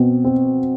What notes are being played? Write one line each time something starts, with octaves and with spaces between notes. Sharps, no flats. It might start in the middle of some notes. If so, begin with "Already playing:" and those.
Already playing: B2 C4
C4